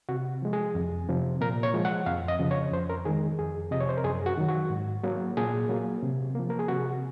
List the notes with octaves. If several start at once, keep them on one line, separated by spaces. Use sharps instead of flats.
C3 F#4
F3 G#3
G#4
F2
C3 F3
A#2 A#4
C#5
F3 G#3
F#5
F2 F5
D#5
C#3 F3
C#5
F2 C5
A#4
D#3 G#3 G#4
F2 G#4
C3 F3 D#5
C#5
C5
A#4
F#2 G#4
F#4
D#3 F#3
F#4
G#2
F#3 A#3
A#2 G#4
F#3 A#3
C3
F3 A#3
A#4
G#4
C3 F#4